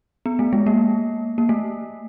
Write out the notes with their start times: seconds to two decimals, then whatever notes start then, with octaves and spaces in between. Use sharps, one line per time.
0.26 B3
0.39 A3
0.53 G#3
0.66 A#3
1.38 A#3
1.49 A3